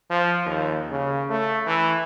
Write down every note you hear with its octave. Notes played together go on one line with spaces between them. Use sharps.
F3
D#2
C#3
A3
E3